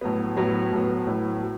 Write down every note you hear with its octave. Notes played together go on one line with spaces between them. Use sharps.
A2 F#3 B3
A2 F#3 B3
A2 F#3 B3
A2 F#3 B3
F#3